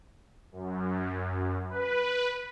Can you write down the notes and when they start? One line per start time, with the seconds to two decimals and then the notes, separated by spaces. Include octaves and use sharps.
0.52 F#2
1.69 B4